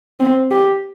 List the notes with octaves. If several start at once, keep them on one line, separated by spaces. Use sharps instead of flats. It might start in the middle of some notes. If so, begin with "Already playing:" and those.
C4
G4